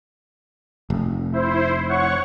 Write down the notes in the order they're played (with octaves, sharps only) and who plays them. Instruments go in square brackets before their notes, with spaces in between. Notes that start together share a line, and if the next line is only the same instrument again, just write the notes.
[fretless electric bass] F1
[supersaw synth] E4 C5
C#5 F#5 C#6